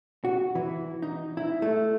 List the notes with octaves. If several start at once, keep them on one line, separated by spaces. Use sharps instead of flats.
F#4
E3
D#4
E4
A3